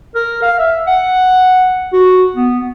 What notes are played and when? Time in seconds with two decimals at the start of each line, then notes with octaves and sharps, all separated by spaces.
0.15 A#4
0.43 F5
0.59 E5
0.87 F#5
1.93 F#4
2.36 B3